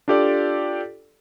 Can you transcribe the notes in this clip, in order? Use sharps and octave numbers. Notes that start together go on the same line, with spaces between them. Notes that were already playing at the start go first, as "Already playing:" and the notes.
D4 F4 G4 A4 D5